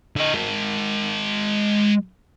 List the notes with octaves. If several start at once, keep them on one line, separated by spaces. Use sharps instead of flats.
D3 D#5
G#3 A#4